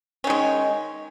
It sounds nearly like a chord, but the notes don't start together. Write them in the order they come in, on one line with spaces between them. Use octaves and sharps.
C#4 D#3 G#3